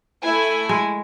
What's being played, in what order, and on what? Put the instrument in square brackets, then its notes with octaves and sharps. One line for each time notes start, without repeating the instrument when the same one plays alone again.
[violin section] A3 E4 G#5
[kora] G#3